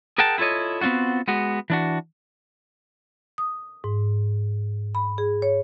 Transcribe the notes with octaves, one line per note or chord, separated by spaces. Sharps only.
G#4 A#4 F#5 G5 A5
E4 F4 A4 C#5 D#5
B3 C4 D4 F4 F#4
G#3 B3 F#4
E3 D4 F#4
D#6
G#2
B5
G#4
C#5